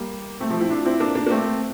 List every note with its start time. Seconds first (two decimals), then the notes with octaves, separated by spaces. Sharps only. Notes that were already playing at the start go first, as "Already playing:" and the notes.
Already playing: G3 A#3
0.40 A3 C4
0.50 F3 A3
0.61 C4 E4
0.70 D4 F4
0.85 C4 E4
1.00 A#3 D4
1.15 A#3 D4
1.26 A#3
1.30 A3 C4